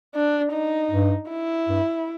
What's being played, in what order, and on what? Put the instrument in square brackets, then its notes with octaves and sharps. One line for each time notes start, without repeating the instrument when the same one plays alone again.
[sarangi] D4
D#4
[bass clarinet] G2
[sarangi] E4
[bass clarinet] G2